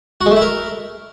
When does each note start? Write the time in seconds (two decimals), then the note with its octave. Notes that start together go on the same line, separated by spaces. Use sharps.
0.21 F#4
0.26 G#3
0.31 A3
0.36 E4
0.41 A#4